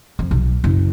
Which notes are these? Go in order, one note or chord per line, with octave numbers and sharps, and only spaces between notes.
F2
B1
F#1